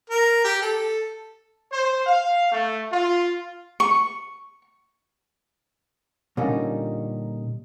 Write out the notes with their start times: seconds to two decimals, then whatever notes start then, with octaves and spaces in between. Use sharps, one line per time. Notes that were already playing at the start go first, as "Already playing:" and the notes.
0.10 A#4
0.44 G4
0.62 A4
1.71 C5
2.06 F5
2.52 A3
2.92 F4
3.80 C#6
6.37 A#2 D3 G3 C#4 D#4 A#4